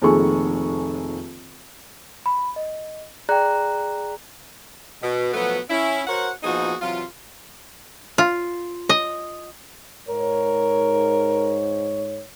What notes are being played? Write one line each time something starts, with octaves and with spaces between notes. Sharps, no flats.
F1 A#1 D#3 G#4 A4 C#6
B5
D#5
G#4 D5 G5 A#5 F#6
B2
B2 F3 F#3 A3 B3
C#4 E4
F#4 A#4 C5 C#5 F#5
A#2 F3 B3 D#4 F#4 G#4
C3 E3 F#3 F4
F4
D#5
G#2 A#4 C#5